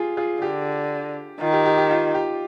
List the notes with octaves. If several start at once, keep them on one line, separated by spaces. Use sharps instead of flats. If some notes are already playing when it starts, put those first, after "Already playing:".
Already playing: F4 G4 G#4
F4 G#4
D3 G4
D#3 F4
G4
G4
G4
F4
G4